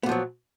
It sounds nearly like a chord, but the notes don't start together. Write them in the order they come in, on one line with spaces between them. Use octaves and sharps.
B3 A#2 F3 F#3